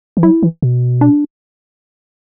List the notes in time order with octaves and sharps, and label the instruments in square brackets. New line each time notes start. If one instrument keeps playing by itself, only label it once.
[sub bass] E3
[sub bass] F#3 [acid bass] E4
[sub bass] E3
B2
[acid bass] D4